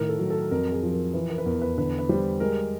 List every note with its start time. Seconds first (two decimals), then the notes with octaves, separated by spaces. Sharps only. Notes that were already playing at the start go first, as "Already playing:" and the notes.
Already playing: A2 D#3 A#4
0.09 A4
0.19 F#3
0.30 A4
0.51 F2 A#4
0.72 G#4
0.83 F3
0.93 A#4
1.14 E3 B4
1.30 A#4
1.38 B4
1.46 E2 A#4
1.62 B4
1.78 D3 B4
1.99 B4
2.09 G3 C5
2.40 G#3 A#4